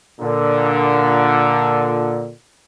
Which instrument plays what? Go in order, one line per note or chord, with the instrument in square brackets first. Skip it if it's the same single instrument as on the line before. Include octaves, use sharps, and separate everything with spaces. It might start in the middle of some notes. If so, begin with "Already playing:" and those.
[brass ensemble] A#2 D3